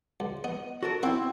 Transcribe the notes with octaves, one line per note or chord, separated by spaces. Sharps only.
C#2
B3 D#5
F#4 A4 A#4
C4 E4 F#4 E5